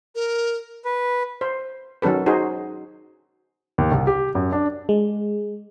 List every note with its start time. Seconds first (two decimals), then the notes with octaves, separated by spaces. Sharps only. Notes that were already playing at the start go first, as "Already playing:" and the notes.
0.15 A#4
0.85 B4
1.41 C5
2.02 D#3 F#3 C#4 A4 B4
2.26 D#4 F#4 G#4 C5
3.78 D#2
3.92 C2
4.07 G4
4.35 F#2
4.52 D4
4.89 G#3